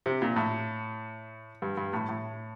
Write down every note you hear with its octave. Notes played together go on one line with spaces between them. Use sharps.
C3
A#2
A2
G2
G2
A2
A2